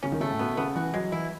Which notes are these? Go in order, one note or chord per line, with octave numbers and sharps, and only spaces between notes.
C#3 C#4
D#3
C#3 A3
A2
B2 B3
C#3 B3
E3 F#4
F#3 G#3
E3 E4